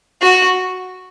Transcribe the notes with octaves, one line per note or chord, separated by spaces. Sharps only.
F#4